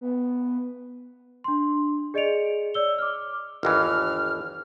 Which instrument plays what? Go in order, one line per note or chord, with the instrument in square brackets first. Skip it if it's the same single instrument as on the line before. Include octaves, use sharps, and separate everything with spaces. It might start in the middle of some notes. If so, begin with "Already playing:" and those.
[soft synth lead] B3
[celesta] D4 C6
G#4 D5 D#5 C#7 D7 F7
C#5 D5 E6 G7
D6 F6
[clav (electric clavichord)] G1 D#2 E3 [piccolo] F6